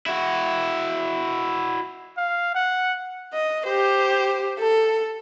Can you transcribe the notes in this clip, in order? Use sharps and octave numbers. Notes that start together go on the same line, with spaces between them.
E4 F#4
F5
F#5
D#5
G4 C5
A4